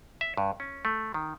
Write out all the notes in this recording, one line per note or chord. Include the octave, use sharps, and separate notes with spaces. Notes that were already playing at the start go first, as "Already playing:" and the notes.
E5
G2
C#4
A3
D#3